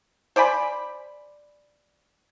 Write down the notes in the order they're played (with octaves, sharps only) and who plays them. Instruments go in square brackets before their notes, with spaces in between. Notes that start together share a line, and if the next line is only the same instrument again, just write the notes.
[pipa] C5 D5 G#5 B5